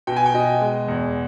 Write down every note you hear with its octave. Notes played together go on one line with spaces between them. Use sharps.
B2 G5
G#5
G5
B2 D#5
G#3
E2